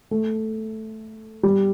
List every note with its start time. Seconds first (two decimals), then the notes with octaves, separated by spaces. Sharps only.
0.11 A3
1.43 G3